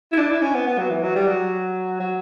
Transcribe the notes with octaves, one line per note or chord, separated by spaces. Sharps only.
E4
D4
E4
C#4
B3
B3
F#3
E3
F#3
G3
F#3
F#3